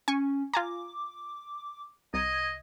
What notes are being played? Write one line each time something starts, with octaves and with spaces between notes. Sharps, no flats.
C#4 G#5 C#6
F4 G#5 A#5 D6
C2 D#5 G#6